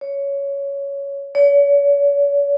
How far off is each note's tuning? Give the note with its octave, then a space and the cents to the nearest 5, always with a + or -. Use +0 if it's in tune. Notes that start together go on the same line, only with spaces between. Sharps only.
C#5 +10
C#5 +40